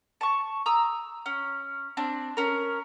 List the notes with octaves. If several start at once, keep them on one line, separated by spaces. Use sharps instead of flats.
A5 C#6
A#5 D#6 E6
C#4
C4 D4
C#4 A#4